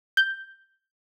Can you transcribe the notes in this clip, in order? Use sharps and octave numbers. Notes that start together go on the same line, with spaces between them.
G6